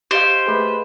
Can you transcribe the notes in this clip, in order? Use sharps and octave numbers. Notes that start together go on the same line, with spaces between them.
G4 C5 D#5 F5 D7
A3 G#4 B4